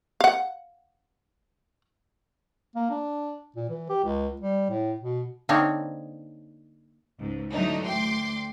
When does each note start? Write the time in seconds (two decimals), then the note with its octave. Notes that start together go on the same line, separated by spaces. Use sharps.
0.21 F5 F#5
2.76 A#3
2.90 D4
3.56 A#2
3.69 E3
3.89 G4
4.04 C#2
4.41 G3
4.70 A2
5.00 B2
5.49 D3 A#3 C4 D#4 C#5
7.20 C#2 G#2
7.52 D3 E3 F#3 A3 D4 D#4
7.86 D2 G5 C6 D6